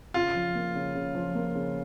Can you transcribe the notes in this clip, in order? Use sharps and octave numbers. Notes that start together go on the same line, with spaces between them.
C#3 F4
F3
A#3
C#3
C#3
F3
A#3
C#3